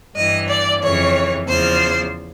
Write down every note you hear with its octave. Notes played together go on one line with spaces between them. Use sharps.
G2 E3 D#5
D5
F2 C#3 E3 C#5
E2 C#3 F3 C5